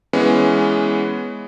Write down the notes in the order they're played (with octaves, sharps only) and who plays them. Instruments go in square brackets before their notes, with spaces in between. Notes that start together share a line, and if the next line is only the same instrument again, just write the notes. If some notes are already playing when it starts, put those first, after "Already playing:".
[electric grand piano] E3 G#3 B3 C#4